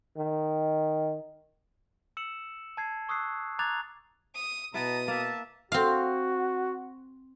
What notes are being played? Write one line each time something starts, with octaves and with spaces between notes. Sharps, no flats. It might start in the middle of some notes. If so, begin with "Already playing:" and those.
D#3
E6 C#7 E7 F#7
A5 G#6 C7
C#6 D#6 E6 F#6 C7
A#5 D6 F#6 G#6 A6 F7
D#6
B2 E4 E5 F#5 A5 A#5 D#6
A#3 E5 A5
C4 F#4 F5